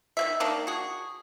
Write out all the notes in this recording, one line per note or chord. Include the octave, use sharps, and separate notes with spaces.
D#3 A#3 E5
D#3 A#3 D4
F#4 G#4